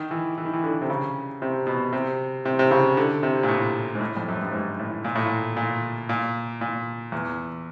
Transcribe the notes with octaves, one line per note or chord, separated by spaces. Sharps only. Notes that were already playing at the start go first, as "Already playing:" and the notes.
Already playing: D#3
E3
E3
D#3
E3
D3
C3
C#3
C3
B2
C3
C3
C3
C#3
D3
C3
A#2
A2
G#2
A2
F2
F#2
G2
G#2
A2
A#2
A2
A#2
A#2
A#2
A#2
E2